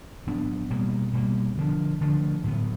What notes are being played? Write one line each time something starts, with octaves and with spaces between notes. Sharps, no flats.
A2 F#3 B3 D4
B2 G3 A#3
B2 G3 A#3
D3 F3 A3 D4
D3 F3 A3 D4
A2 F#3 B3